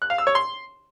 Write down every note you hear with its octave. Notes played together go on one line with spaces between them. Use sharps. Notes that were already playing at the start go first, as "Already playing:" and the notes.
F#6
F5
E6
C#5
C6